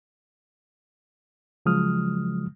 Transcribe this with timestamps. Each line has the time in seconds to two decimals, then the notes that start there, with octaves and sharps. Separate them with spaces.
1.66 C#3 F3 F#3 G#3 D#6 F6